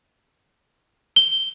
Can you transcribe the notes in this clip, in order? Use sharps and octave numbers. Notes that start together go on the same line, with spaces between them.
G7